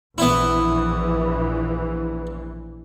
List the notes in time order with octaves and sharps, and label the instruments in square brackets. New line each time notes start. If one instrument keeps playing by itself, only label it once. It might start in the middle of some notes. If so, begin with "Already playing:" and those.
[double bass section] A#1 E3 [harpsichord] B3 E4